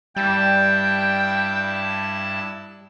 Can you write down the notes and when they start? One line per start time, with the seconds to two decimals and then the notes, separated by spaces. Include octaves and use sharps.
0.16 G2 G3 E4 G5 A5